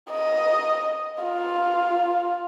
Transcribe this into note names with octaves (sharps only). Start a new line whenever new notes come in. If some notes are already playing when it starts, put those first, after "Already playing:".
D#5
F4